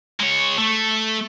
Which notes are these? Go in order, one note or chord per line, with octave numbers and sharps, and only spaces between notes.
G#3 C#5
A3